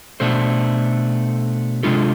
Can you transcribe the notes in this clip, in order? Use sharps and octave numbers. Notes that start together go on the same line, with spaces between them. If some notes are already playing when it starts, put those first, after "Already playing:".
B2 A3 D4 A4 C5
C3 G#3 D4 F4 A4